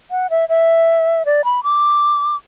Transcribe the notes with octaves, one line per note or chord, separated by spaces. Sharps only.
F#5
E5
E5
D5
B5
D6